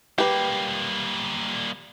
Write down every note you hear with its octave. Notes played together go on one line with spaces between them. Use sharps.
G3 A#3 G4 B4